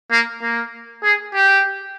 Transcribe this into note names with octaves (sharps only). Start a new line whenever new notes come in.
A#3
A#3
G#4
G4